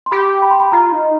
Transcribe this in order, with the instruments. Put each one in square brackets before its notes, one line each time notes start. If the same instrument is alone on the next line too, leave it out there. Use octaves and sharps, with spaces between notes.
[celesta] C6
[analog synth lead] G4 [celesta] B5
[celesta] B5
C6
B5
[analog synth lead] F4 [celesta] A#5
[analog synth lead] D#4